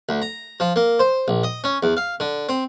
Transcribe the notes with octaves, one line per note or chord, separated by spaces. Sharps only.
D2
A#5
F3
A#3
C5
A#1
D#5
C#4
E2
F5
D3
C4